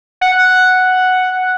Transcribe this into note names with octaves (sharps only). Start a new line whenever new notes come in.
F#5